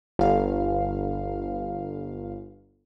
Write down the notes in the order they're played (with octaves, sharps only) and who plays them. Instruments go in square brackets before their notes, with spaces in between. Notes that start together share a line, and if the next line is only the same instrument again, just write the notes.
[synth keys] G1 F5